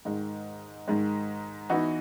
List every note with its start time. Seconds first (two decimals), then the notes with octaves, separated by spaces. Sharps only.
0.05 G#2 D#3 G#3
0.88 G#2 D#3 G#3
1.69 E3 B3 D#4 F#4